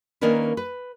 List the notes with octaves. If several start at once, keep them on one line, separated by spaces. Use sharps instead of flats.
D#3 A#3 C#4 D4 A#4 B4
B4